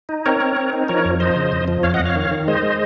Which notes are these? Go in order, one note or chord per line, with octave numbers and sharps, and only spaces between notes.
D#4
C4 A#4 C#5
C4
C4
D#4
F3 A#4 C#5
F2
F3 C5 D#5
C#3
F2
F3
F2 C#5 F5
D#5 F#5
F2
C#5 F5
D#3
D#3
G#3 C5 D#5
G#3